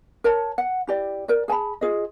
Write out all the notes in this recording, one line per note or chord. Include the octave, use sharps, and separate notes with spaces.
A#4 C#5 A5
F#5
E4 G4 D5
A#4 D5
G#4 G#5 A5 B5
F4 G#4 D#5